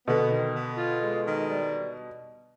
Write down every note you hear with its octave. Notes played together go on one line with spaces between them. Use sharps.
B2 D3 B3
D#3
B3
F4
G#3
D#3
G3